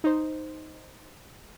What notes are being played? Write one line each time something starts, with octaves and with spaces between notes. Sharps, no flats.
D#4 C5